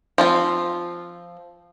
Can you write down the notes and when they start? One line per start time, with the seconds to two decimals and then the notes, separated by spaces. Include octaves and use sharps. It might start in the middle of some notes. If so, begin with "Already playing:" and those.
0.18 F3 C4 F4